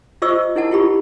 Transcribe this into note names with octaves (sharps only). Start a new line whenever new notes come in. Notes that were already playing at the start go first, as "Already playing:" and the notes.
F4 C5 D#5 C#6 E6
D#4 E4 A#4 F#5 A5
E4 F4 G4 B5 C#6